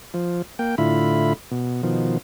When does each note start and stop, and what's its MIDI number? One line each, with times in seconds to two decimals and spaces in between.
0.14 0.42 53
0.59 0.75 58
0.59 0.75 79
0.78 1.33 45
0.78 1.33 50
0.78 1.33 64
0.78 1.33 65
0.78 1.33 83
1.51 1.83 47
1.83 2.18 47
1.83 2.18 51
1.83 2.18 53